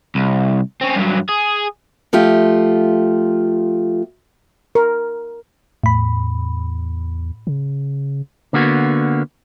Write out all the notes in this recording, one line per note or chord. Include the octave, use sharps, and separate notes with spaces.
C2
C4 C#4
G2 F#3
G#4
F3 A3 F4 G4
A#4
E2 A2 B5
C#3
D3 A#3 B3 F#4